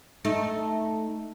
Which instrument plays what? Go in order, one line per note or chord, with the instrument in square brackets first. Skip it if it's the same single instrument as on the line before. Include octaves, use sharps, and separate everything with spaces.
[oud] A3 D#4